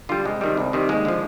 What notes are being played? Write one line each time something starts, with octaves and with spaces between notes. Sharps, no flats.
D3 G3 F4
C2 G#3
C3 D#3 G3
C2
C3 D#3 G3
D#2 G#3
D3 F3